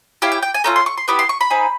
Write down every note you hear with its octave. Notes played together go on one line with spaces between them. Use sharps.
C#4 E4 G4 F5
G5
G5
G#5
A3 C#4 F4 A#5
C6
C#6
C6
B3 E4 G4 B5
C6
C#6
B5
C4 D#4 G#4